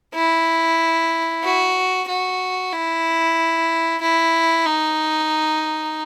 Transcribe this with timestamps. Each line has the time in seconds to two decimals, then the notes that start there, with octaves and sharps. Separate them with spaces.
0.15 E4
1.44 F#4
2.08 F#4
2.73 E4
4.01 E4
4.65 D#4